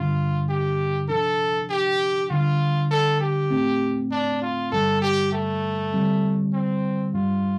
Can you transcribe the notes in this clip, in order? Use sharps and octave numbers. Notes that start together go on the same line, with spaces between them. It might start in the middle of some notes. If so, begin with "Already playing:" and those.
Already playing: G2 D3 G3 D4 F4
G4
C3 F3 D4 A4
G4
D3 G3 D4 F4
A4
G4
A2 A3 C4
D4
F4
G2 D3 G3 A4
G4
A3
D3 G3 C4
C4
G2 G3 D4 F4